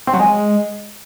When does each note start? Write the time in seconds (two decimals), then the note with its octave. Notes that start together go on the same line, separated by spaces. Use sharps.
0.07 C4
0.13 F#3
0.20 G#3